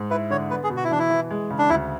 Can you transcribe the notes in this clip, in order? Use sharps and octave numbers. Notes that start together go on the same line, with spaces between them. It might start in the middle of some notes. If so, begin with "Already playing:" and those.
Already playing: G#2
E4 B4
D3 C#5
B3 B4
G#4
B2
F#4
E4
E3 D4
E4
E3
G#3
C#3
D4
D2 E4